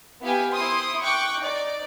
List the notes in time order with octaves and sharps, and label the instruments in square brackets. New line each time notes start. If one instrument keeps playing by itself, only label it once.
[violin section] B3 E4 G4 F5 G5 G#5
E4 C5 C6 D#6
G5 C#6 D6 F#6
D#4 D5